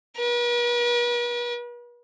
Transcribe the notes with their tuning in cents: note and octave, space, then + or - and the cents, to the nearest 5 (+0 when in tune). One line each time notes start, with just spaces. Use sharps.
B4 -45